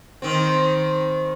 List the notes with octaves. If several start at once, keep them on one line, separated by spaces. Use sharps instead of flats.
D#3 C4